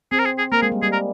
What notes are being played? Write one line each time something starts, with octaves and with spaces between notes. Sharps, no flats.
C4 G#4
A#4
G#4
G#4
A#3 A#4
G#3 G#4
G3
G3 G#4
A#4